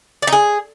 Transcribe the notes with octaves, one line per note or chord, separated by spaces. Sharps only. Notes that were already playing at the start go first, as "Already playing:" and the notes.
D5
D#4
G#4